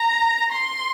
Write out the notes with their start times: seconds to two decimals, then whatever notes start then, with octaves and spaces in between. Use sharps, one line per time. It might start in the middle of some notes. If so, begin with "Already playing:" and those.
Already playing: A#5
0.52 C6